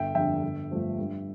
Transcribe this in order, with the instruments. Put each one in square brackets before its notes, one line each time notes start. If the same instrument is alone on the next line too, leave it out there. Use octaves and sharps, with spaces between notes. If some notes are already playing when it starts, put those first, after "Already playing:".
Already playing: [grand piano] G1 E5 G5
F2 D3 G3 D4 E5 G5
G1
G2 F3 A3 C4
G2